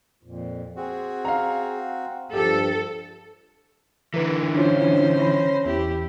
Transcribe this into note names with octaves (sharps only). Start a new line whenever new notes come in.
F2 A#2
C4 F#4 G#4
F5 A#5
G2 F3 G4 A4
D3 E3 A#4 B4
C#4 D4 F4 C5
B5 A#6
E2 E4 G4